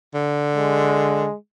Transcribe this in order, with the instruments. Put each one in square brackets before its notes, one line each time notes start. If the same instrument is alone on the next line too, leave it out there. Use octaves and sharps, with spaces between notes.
[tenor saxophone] D3
[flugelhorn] G#3